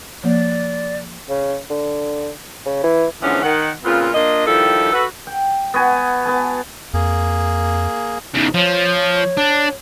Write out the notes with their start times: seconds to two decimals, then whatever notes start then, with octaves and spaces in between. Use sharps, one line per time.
0.24 F3 A#3 D5
1.29 C#3
1.70 D3
2.65 C#3
2.83 E3
3.22 G#2 D3 E3 F3 B3 C#4
3.43 D#3 F#5
3.84 A#2 C#3 B3 C4 F4
4.14 A#3 D4 F4 D#5
4.47 D#3 F3 G3 E4 A4
4.92 F#4 A4 B4
5.27 G5
5.74 B3 F#4 G#5
6.25 B3 G#5 A5
6.94 F2 A#3 G#4
8.34 E2 C#3 D#4
8.54 F3 C#5
9.37 D4